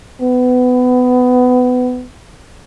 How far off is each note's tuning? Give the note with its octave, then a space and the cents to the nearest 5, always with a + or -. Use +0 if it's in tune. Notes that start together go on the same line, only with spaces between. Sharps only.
B3 +20